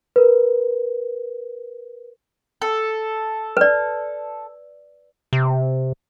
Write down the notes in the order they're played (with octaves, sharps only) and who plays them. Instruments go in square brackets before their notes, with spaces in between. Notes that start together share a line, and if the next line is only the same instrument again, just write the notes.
[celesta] A#4 B4
[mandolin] A4
[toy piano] B4 D5
[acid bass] C3